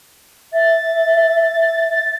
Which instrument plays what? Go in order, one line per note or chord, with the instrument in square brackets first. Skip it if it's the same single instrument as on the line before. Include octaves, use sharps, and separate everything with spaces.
[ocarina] E5 [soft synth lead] A6